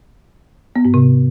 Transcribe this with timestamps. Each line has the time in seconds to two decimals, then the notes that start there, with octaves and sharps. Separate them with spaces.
0.76 B3
0.85 G#2
0.94 C3